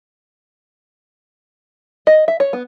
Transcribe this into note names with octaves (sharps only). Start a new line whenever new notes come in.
D#5
E5
C#5
B3